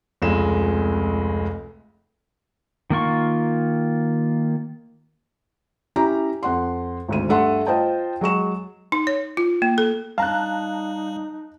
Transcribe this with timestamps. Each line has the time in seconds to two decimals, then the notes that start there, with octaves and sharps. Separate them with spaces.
0.22 F1 C#2 G#3 E7
2.90 D#3 A#3 F4 C#6
5.96 C#4 E4 G4 A#5
6.43 F2 F#5 C6
7.08 G#1 D2 D#7
7.29 G2 A3 F#5 C6
7.66 F4 C5 D#5 G5 A5
8.21 F#3 G#3 C#6 E7
8.92 D#4
9.07 C#5
9.37 F4
9.62 A#3
9.78 A4
10.18 G3 D#4 F5 A5 A#5 F#6